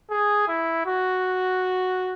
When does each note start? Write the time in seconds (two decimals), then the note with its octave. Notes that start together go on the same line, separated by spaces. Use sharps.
0.11 G#4
0.48 E4
0.86 F#4